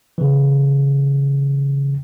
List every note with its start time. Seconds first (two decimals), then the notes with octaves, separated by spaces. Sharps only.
0.18 C#3 E3